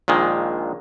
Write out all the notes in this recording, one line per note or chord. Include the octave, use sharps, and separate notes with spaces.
A#1 A#2 D#3 G#3